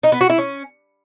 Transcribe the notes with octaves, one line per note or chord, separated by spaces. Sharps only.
D#4
B3
F#4
E4
C#4